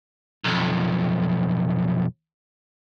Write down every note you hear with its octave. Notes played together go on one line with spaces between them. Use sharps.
B1 F2